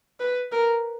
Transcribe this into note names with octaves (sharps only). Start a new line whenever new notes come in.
B4
A#4